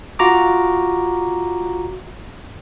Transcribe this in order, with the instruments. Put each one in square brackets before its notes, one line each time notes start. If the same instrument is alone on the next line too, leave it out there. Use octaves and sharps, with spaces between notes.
[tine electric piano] F4 F#4 A#5 D6